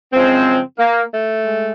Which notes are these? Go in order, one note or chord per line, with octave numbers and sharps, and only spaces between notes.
F#2 C#3 F3 G#3 C4
A#3
A3
G#3